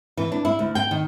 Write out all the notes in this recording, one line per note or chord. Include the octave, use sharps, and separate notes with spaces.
E3
D4
E4
D2
G5
D#3